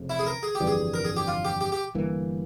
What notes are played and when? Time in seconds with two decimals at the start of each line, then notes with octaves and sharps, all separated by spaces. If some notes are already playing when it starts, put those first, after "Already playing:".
Already playing: F1 F2 C#3
0.10 E4
0.19 G#4
0.26 A#4
0.43 G#4
0.55 G4
0.60 G1 F2 E3 G3
0.67 G#4
0.94 A#4
1.05 G#4
1.17 G4
1.27 F4
1.45 G4
1.61 G4
1.72 G4
1.95 G1 G2 E3 A#3